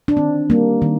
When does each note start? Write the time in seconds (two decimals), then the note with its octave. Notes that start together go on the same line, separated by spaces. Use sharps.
0.08 D4
0.17 D#3 C4
0.50 G3 A#3
0.82 D#3